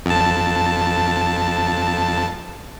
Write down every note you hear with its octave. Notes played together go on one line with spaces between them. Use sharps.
F2 A5